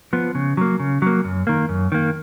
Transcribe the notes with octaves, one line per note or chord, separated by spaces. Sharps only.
F3 B3
C#3
F#3 A#3
C#3
F#3 A#3
F#2
D#3 A#3
F#2
D#3 A#3